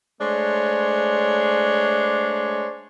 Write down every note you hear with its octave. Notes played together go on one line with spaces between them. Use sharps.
G#3 A3 D4 C5 C#5